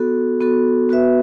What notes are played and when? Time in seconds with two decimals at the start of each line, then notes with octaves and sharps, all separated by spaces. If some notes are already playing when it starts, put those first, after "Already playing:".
Already playing: B3 F#4 A4
0.41 B3 F#4 A4
0.89 B3 F#4 B4 E5